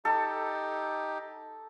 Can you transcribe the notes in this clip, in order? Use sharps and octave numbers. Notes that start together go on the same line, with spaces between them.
D#4 G4 A4